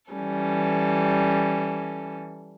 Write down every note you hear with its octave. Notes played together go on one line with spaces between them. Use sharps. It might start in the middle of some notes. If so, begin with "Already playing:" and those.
E3 G3 C#4 A4